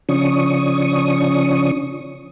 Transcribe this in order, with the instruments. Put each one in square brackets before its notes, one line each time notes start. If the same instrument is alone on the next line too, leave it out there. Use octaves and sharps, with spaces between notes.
[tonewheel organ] C#3 F3 C#4 D4 C#6 D#6